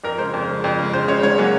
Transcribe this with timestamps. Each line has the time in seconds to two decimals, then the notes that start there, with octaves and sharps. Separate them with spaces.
0.04 F2 A#4
0.18 C#3 G#3 C5
0.34 F2
0.48 C#3 G#3
0.64 F2
0.79 C#3 G#3
0.93 F2 C5
1.08 C#3 G#3 C#5
1.23 G#2 C#5
1.38 F#3 A#3 C#4